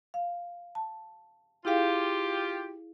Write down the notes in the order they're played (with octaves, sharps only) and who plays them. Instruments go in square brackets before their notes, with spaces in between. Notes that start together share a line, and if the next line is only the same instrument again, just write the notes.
[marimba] F5
A5
[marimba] E4 G#4 F5 [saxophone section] F4 G4